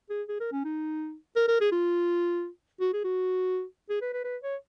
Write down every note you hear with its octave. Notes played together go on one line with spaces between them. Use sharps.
G#4
G#4
A#4
C#4
D#4
A#4
A#4
G#4
F4
F#4
G#4
F#4
G#4
B4
B4
B4
C#5